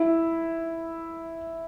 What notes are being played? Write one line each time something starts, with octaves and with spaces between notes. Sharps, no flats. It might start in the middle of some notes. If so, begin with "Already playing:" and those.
Already playing: E4